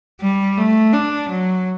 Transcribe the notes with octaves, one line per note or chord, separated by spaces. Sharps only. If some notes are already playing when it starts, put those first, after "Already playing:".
G3
A3
D4
F#3